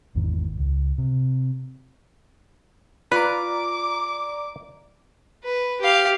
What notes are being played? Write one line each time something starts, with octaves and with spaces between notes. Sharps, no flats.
G#1 E2 G#2 D#3
C#2
C3
F4 B4 D5 A#5 D6
B4
G4 F5